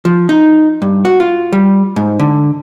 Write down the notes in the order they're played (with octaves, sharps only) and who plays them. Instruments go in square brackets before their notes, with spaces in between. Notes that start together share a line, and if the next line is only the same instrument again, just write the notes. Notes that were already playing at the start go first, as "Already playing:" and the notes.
[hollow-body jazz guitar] F3
D#4
G2
F#4
F4
G3
G#2
D3